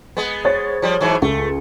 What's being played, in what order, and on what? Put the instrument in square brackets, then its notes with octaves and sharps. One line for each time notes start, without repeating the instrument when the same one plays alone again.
[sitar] G#3 B3
[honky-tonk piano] C5 C#5 A6
[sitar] F3 G3
G#2 E3 F#3
[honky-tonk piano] C#2 [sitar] A3